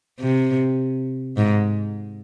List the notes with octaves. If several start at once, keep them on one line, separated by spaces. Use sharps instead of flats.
C3
G#2